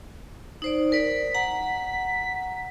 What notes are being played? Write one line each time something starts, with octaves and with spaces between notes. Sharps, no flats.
D#4 C5 D5
A#4 D5 B6
F#5 A#5